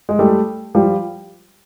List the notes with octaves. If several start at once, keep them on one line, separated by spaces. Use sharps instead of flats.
G#3
G3 A3
F3 G3